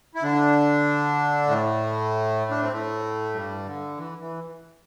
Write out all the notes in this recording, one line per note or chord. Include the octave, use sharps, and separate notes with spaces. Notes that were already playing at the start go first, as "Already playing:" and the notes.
E4
D3 D4
A2 A3
D4
C4
A2 A3
G2 G3
D3
E3
E3